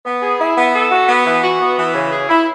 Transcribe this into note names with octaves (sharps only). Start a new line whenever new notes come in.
B3
G#4
E4
B3
A4
F#4
B3
E3
F#4
B3
E3
C#3
G#4
E4